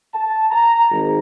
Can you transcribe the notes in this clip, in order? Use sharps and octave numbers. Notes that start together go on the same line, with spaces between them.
A5
A#5
G#1